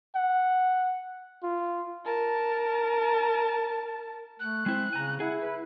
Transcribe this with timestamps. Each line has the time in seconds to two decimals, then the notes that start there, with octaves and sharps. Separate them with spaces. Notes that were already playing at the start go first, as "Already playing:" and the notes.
0.15 F#5
1.43 F4
2.05 A#4 A5
4.40 A3 F#6
4.66 G#3 C4 E4 C5
4.93 C#3 G#5 A#5
5.20 E4 G#4 F#5
5.41 B4